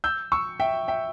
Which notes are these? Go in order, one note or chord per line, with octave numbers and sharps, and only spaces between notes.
E6 G6
C#6 E6
E5 G5
E5 G5